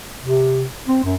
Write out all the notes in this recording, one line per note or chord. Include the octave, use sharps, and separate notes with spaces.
C3
C4
F#2